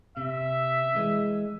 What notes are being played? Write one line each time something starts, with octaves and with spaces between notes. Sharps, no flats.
C3 E5
E3 G#3